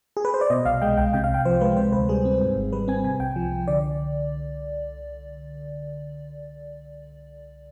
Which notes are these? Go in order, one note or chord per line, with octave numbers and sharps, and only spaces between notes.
G#4
B4
C5
D5
B2 D#5
C2 F5
G#3 G5
C2 G5
C3 G5
F5
C2 G5
F3 C5
G#3 B4
C3 C5
D2 B4
G3 G#4
C4
G#2
G#1
G3 B4
C4 G#5
C3 G#5
C2 G5
F3
C2
D3 D5